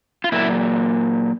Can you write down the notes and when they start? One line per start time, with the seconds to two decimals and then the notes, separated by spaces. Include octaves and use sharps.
0.24 F4
0.32 A#2 F#3 A#3 E4